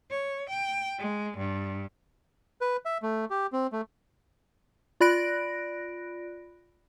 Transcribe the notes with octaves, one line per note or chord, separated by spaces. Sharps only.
C#5
G5
G#3
G2
B4
E5
A3
G4
C4
A3
F4 D5 B5 F#6 A#6 D7